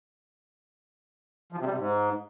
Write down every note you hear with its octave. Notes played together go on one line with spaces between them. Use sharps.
F3
C3
G3
C3
G#2